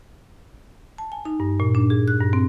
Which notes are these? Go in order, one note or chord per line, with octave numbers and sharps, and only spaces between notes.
A5
G#5
D#4
G2
A#2
D4
G#4
F#6
G2
C4